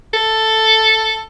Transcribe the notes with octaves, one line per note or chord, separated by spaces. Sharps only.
A4